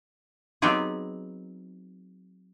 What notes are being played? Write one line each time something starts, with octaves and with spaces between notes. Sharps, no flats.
F#3 B3 C4 D#4 G4 G#4